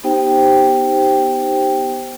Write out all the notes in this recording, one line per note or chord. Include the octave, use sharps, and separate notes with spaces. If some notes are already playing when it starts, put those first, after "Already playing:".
B3 D#4 G4 C5 G5